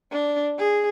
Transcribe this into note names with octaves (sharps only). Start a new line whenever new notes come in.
D4
G#4